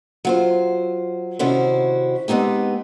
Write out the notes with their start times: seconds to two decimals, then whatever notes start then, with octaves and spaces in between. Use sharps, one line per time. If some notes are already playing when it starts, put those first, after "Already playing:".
0.25 F#3 F4 C5
1.39 C3 D#3 C#4 E4 F#4 C5
2.28 G#3 B3 C4 D#4 G4